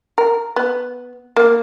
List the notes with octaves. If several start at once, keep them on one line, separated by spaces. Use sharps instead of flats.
A#4
B3
A#3